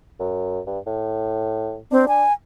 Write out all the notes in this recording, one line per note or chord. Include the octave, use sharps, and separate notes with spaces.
F#2
G2
A2
C4 D4
G#5